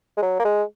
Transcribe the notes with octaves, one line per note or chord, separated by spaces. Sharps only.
G#3
F#3
A#3
G#3